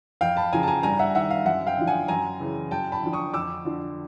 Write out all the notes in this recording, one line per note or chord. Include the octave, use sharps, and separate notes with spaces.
F2 F5 G5
A5 B5
C#3 F3 G#5 A#5
A5
G#5 A#5
G2 G#5 A#5
E5 F#5
D#3 E5 F#5
F5
F#2 E5 F#5
F5 G5
D3 F3
F#5 G#5
F#2 G#5 A#5
C#3 E3
F#2 G5 A5
A5 B5
D3 F3
C#6 D#6
F2 D6 E6
D3 F3